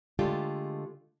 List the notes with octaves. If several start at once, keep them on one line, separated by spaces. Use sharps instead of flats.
D3 G#3 A3 F4 G4 A4